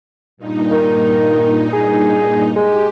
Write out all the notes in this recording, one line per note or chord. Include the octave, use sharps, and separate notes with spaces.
G2 A#2 D#4
D#3
G#4
G#3 G4